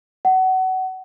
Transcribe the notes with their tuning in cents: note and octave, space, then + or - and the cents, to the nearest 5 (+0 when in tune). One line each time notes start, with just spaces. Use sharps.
F#5 +25